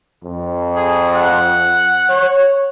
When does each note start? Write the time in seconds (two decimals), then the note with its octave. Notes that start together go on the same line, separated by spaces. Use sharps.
0.24 F2
0.76 G#4
1.16 F#5
2.10 C#5